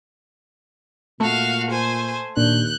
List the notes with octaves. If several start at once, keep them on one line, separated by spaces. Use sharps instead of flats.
A#2 A3 F#4 F5
C5 G#5
D#2 A#2 A#3 D4 F#6 G6